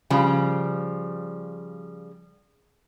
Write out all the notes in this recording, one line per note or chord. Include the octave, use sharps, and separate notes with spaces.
C#3 F3 G3